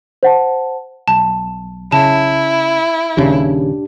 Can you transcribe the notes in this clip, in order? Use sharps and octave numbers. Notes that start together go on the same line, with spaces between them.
C5 F#5 A5
B1 A5
C#3 E4 A5
D#1 D#2 C#3 D4 G4